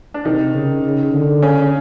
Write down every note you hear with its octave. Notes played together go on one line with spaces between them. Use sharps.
D4
C3 D#3 D#4
C#3
C#3
D3
C#3 C#4